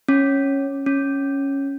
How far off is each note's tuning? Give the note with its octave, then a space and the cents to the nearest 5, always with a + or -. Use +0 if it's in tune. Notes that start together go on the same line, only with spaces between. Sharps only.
C#4 -10
C#4 -5